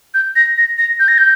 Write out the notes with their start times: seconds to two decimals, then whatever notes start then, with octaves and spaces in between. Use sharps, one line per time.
0.14 G6
0.36 A#6
0.58 A#6
0.78 A#6
1.00 G6
1.08 A#6
1.18 G6